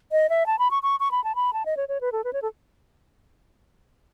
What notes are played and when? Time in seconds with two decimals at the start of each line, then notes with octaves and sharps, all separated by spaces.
0.12 D#5
0.30 E5
0.46 A5
0.59 B5
0.71 C#6
0.83 C#6
1.00 C#6
1.11 B5
1.24 A5
1.35 B5
1.53 A5
1.66 D#5
1.77 C#5
1.89 C#5
2.01 B4
2.12 A4
2.24 B4
2.33 C#5
2.42 A4